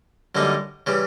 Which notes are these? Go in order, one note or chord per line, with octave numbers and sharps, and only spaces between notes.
F#2 D3 G3 A#3 D#4
C#3 E3 G3